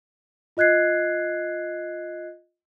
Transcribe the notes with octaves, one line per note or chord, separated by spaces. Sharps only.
F4 D#5 F#6 G#6 C7